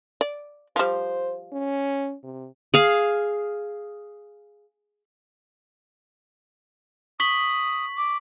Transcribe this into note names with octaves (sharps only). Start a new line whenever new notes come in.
D5
F3 G3 C5
C#4
C3
G#4 F5
C#6 D#6 B6 F#7
D6